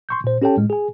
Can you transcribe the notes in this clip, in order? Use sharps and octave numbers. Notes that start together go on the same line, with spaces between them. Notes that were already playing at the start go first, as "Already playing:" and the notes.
C6 C#6 G6
A#2 C5
C#4 G4 A4 C#5 G5 A5
A2 G#3
G#4 G#5